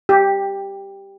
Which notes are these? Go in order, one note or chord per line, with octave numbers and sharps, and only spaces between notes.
G4